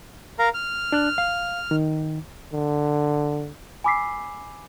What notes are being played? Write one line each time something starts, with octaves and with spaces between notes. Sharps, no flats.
A#4 F5 A#5
F6
D4 F#6
F5
D#3
D3
G#5 B5 D6 E6 B6 C7